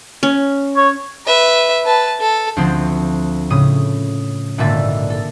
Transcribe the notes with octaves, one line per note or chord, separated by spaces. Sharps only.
C#4
C#5
B4 E5
B4 A5
A4
D2 F3 C4 C5
A2 C#3 D#6
G#1 A#2 D3 E5 A6
A4